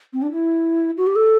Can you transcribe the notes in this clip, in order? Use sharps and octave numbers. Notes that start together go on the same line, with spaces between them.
C4
D4
E4
F#4
G4
A4